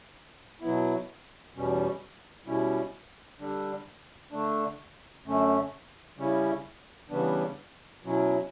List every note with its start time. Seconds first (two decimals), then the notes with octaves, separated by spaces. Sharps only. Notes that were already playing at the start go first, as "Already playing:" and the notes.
0.60 B2 F#3 B3 E4
1.54 E2 B2 G3 C#4
2.46 B2 G3 C#4 E4
3.39 D3 G3 D4
4.31 D3 A3 D4
5.25 F#2 D3 A3 C#4
6.17 C#3 G3 C#4 E4
7.10 C#3 E3 G3 B3 D4
8.04 B2 F#3 C#4 E4